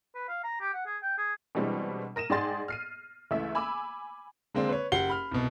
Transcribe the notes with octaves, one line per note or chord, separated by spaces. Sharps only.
B4
F5
A#5
G4
F#5
G#4
G5
G#4
B2 E3 G3 G#3 C4 D4
A#4 A#6 D#7 E7
G#2 G#4 D5 G5 C6 A6
F6 C7 D#7
C#2 E3 A3 E5
G#5 B5 D6 E6
D3 G#3 A#3 C4 D4
B4 C#5
F#1 G4 F#5 C7 G7
B5 F6
C2 B2